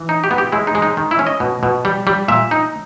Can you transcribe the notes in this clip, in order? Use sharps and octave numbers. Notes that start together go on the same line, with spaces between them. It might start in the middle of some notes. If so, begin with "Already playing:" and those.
Already playing: E3
D#4
G4
B3
G4
G#3 E4
D#4
G#3
D#4
D#3
E4
C#4
D#5
B2
B2
G3
G3
A#2 E5
D#4